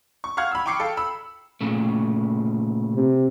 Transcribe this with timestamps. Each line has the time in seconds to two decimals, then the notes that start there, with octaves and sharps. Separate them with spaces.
0.24 C#6
0.37 F5 F#5 C#6 F6 G#6
0.51 B5 E6
0.66 G5 B5 C#6 D6 C7 C#7
0.80 A4 F5 G5
0.97 B5 E6
1.61 A#2 C#3 A3
2.95 C3